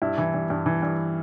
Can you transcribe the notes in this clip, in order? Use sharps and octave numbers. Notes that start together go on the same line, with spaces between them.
G2 E4
E3
G2
G2
E3
G2